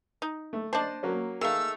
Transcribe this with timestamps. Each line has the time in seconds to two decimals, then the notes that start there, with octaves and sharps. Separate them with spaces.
0.22 D#4
0.53 A3
0.73 D4 C5 D5 D#5 A5
1.03 F#3 A#3 C#4
1.41 D#3 A3 G#4 F5 E6